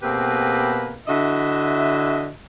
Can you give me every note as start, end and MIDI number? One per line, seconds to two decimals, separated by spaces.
0.03 0.97 47
0.03 0.97 58
0.03 0.97 60
0.03 0.97 67
0.03 0.97 68
0.03 0.97 71
1.07 2.29 50
1.07 2.29 64
1.07 2.29 66
1.07 2.29 75
1.07 2.29 76